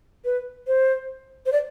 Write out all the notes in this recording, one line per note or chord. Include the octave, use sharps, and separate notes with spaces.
B4
C5
C5
D5